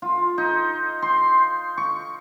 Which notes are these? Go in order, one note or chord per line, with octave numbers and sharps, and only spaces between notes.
F4
D#4
C6
C#6